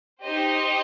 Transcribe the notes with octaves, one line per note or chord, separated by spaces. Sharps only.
D#4 G4 C5 D#5